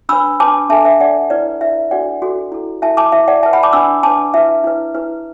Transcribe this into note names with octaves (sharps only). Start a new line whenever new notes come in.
D4 B4 B5 E6
D4 B4 A5 D6
D4 A4 E5 A5
E5
D4 A4 D5 F#5
E4 B4 D5
E4 B4 E5
D4 F#4 A4 D5 F#5
D4 F#4 A4
E4 A4
E4 A4 E5 A5
A5 D6
E4 B4 E5
D5 F#5
E4 B4 E5 A5
F#5 B5
A5 D6
D4 B4 B5 E6
D4 B4 A5 D6
E4 B4 E5
E4 B4
E4 B4